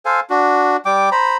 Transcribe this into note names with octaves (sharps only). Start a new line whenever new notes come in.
A4 C5 F5 G#5
D4 F#4
G3 G5 D6
C5 A#5 B5